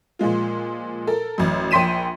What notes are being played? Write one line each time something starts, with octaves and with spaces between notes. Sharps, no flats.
A#2 F3 G#3 F4
A4 A#4
A1 F#2
A#1 G5 C6 B6 D#7 E7